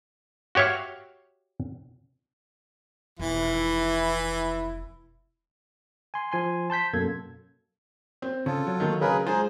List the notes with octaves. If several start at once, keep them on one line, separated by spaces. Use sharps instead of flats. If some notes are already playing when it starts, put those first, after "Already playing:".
F#4 G4 C#5 E5 F5
F1 B2 E3 E4
G#5 C6
F3 G#5 C6
A5 C6 G6 B6
F#2 B2 A#3 A4 G#6
C4
C#3 F4 A4
F#3
D#3 A3
C#3 G#4 A#4 B4
G#3 D#4 F4 G#4 C5 A#5